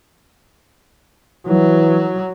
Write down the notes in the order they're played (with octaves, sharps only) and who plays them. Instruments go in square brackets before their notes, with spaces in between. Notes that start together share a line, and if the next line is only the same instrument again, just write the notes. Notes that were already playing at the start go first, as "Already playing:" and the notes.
[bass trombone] E3 [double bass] F#3